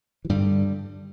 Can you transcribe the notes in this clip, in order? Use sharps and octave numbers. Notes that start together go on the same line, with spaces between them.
E3
G2 D3 G3